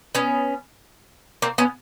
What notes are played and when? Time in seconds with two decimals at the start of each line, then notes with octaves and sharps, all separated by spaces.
0.15 B3 C#4
1.42 A#3 C4
1.58 B3 C#4